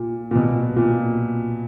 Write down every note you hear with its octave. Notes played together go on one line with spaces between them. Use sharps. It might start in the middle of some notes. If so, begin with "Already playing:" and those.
Already playing: A#2
A#2
B2
A#2